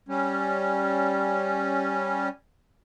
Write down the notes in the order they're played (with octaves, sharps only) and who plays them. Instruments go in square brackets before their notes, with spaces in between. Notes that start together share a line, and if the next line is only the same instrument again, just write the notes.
[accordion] G3 C#4